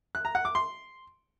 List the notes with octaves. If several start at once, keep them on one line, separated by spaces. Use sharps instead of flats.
F#6
A#5
F#5
D6
C6